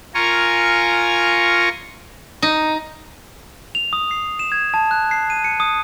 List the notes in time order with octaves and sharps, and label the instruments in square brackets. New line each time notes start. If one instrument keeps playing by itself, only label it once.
[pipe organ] F4 A#4 G#5 A#5 C#6
[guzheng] D#4
[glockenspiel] F7
D#6
C7
E7
G#6
A5
F#6
C7
D#7
C#7
D#6